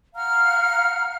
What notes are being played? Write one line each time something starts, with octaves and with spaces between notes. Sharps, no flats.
F5 F#5 A#5 F6